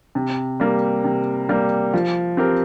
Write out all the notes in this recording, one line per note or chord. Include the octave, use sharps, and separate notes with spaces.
C3
G3 A#3
C3
G3 A#3
F3
C4 G4 A#4